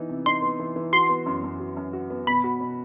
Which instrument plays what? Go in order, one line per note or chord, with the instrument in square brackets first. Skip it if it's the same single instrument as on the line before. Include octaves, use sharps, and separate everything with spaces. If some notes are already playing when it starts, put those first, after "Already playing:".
Already playing: [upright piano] E3 B3 D#4
C3
[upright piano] D#4 [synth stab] C6
[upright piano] B3
E3
E3
[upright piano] F#4 [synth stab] C6
[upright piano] B3
F#2
F#2
F#4
F#2
F#4
B3
[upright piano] B2 [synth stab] B5
[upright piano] F#4
B2